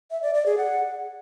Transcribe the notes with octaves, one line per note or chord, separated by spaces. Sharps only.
E5
D5
D5
G#4
F#5